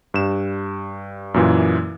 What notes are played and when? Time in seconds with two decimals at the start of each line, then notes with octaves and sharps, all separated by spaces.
0.14 G2 E7
1.34 F#2 A#2 E3